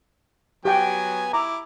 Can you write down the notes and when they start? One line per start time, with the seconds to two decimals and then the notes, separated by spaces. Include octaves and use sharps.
0.65 F#3 B3 G4 G5 G#5
1.33 E4 A#5 D6